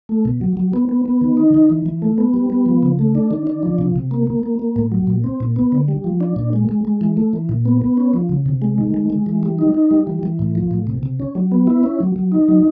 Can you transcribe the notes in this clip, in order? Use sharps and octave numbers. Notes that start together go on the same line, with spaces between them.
A3
B2
F#3
F#3
B3
B3
B3
D#3
D#4
D#3
E3
E3
A3
B3
G3
B3
F3
C#3
A3
D4
D#3
D4
F3
C3
C3
A#3
A#3
A#3
A#3
A2
F#3
A#2
C4
A#2
B3
D3
G3
F3
D4
A#2
G#3
G#3
G#3
E3
A3
E3
A#2
B3
B3
C#4
F3
C#3
C3
G#3
D#3
G#3
G#3
E3
G3
D#4
D#4
G3
E3
E3
A2
F3
A2
C3
C3
C#4
F#3
B3
E4
C#4
F#3
F#3
D#4
F#3